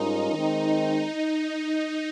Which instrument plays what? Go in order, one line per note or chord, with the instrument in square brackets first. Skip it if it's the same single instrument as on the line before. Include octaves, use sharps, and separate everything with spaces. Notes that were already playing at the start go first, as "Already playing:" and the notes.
Already playing: [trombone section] G#2 G3 C#4 F4 A#4 [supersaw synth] D#4
[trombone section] D#3 G#3 C4 D#4